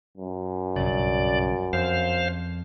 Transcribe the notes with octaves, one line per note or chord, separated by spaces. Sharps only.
F#2
B1 G2 C#3 D5
F2 C5 F5